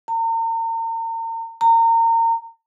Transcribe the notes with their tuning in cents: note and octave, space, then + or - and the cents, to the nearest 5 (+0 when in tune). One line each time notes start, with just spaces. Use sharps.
A#5 -40
A#5 -30